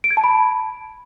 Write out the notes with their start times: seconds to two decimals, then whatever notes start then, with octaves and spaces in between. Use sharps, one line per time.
0.04 D7
0.11 G#6
0.17 A5
0.24 B5